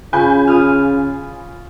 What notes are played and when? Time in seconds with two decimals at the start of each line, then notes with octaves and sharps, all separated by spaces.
0.13 C#3 F4 G#5 B5 C#6 G6
0.47 F4 D#6 F6